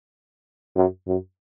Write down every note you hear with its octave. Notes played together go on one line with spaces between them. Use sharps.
F#2
F#2